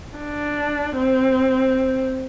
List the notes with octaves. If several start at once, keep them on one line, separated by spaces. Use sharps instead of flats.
D4
C4